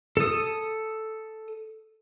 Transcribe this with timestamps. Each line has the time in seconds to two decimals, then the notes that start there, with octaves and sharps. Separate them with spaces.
0.17 A4 D#6